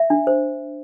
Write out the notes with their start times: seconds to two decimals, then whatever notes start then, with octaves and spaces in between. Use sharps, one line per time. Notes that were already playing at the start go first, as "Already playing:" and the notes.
Already playing: E5
0.10 D4
0.27 C5